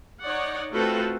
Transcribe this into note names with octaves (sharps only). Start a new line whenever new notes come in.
D#4 C#5 D5 F#5
A3 C4 F4 F#4 A4 B4